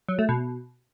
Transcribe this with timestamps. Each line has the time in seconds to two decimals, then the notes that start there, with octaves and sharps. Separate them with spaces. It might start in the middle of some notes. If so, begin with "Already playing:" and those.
0.09 F#3
0.19 A3
0.29 B2